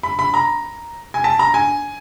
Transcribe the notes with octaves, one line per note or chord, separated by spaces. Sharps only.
B5
B5
A#5
G#5
A5
A#5
G#5